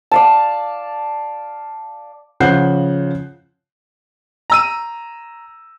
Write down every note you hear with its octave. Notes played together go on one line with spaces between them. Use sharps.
D5 F5 A5
C#3 F3 F#5 F#6 G6 C7
A#5 E6 D#7